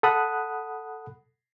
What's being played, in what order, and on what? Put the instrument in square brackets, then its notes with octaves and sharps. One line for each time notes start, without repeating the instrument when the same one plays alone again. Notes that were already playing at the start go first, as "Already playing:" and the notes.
[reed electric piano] A4 F#5 B5 D#6 F#6